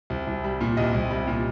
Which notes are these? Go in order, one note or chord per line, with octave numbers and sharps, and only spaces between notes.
C2
C2
G3
A#2
C2 D#5
C2
G3
A#2